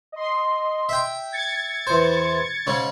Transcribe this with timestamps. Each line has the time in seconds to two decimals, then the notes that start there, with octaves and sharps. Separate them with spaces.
0.12 D#5 C6
0.89 E5 G5
1.32 G#6 A6 C#7
1.87 E2 C5
2.67 G#2 C#3 C#4